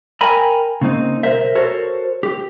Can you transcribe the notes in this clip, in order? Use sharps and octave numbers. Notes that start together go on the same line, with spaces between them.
A#4 G5 G#5 A#5 B5
C#3 A#3 C4 D#4
B1 A#4 C5 E5
F#4 A4 A#4 C5 C#5
G4